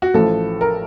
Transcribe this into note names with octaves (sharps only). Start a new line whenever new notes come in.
F#4
A1 A2 F3 A3 A4
A#4